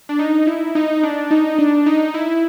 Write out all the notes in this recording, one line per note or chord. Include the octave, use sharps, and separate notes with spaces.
D4
D#4
E4
D#4
D4
D#4
D4
D#4
E4